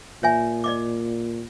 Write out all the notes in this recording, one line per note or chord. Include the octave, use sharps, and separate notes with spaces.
A#2 C#5 E5 G#5
D5 D#5 D6